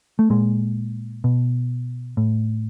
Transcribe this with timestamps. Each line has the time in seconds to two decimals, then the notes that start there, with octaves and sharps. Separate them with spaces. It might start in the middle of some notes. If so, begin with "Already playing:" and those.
0.19 A3
0.30 A#2 G#3
1.24 B2
2.17 A2